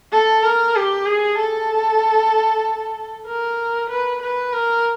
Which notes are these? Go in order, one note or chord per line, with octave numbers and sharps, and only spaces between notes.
A4
A#4
G4
G#4
A4
A#4
B4
B4
A#4